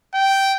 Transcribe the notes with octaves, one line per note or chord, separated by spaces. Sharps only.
G5